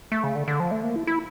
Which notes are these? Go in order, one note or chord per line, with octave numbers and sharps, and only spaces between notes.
A3
C#3
D3
D3
F3
A3
A#3
E4
E4